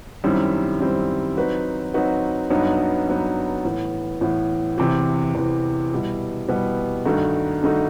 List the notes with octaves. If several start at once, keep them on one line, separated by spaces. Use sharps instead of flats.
F#2 D#3 G3 C4 E4
F#2 D#3 G3 C4 E4
F#3 C4 D#4 F#4 B4
F#3 C4 D#4 F#4 B4
G2 F#3 B3 D#4
G2 F#3 B3 D#4
A2 E3 B3
A2 E3 B3
E2 C3 E3
E2 C3 E3
B2 G3 B3 E4
B2 G3 B3 E4
G2 D#3 A3 D#4 F#4
G2 D#3 A3 D#4 F#4